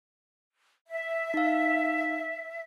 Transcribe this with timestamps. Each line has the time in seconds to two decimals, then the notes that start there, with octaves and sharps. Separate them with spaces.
0.87 E5
1.34 D#4 F5